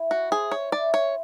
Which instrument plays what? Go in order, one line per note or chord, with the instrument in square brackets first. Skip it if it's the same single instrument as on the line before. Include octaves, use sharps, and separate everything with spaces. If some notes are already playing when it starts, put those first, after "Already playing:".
Already playing: [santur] E4
[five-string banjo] F#4
[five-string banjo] G#4 [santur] C5
[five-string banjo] C#5
[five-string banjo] D5 [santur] E5
[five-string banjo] C#5